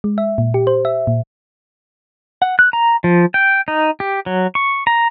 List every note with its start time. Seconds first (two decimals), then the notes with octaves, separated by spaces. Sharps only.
0.04 G#3
0.18 E5
0.38 A#2
0.54 G4
0.67 C5
0.85 E5
1.07 A#2
2.42 F#5
2.59 F#6
2.73 A#5
3.04 F3
3.34 G5
3.68 D#4
4.00 G4
4.26 F#3
4.55 C#6
4.87 A#5